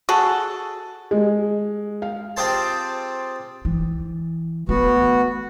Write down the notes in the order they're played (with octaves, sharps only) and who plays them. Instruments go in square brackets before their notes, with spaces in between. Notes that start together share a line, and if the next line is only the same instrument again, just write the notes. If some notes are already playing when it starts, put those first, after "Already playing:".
[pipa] F#4 G#4 A4
[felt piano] G#3
F5
[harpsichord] C4 F4 G4 G#4 C5 A5
[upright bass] E3
[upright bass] A3 [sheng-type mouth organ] B3 F#4